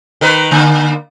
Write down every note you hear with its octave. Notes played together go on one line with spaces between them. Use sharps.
D#3 A#4 B4
D3 A#3